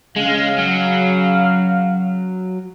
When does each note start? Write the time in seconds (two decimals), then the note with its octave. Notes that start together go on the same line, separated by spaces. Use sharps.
0.17 C#3 G#3 F5
0.58 F#3